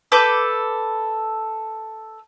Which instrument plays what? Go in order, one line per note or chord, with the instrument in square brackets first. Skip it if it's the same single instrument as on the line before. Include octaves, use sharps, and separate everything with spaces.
[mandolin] A4 B4 D6 G6